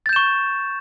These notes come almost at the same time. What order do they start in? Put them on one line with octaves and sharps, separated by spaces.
A6 G6 E7 C#6